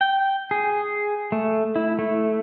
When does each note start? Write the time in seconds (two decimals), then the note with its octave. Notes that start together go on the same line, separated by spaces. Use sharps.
0.01 G5
0.51 G#4
1.32 A3
1.76 E4
1.99 A3